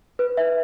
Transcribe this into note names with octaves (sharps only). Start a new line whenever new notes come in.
B4
E5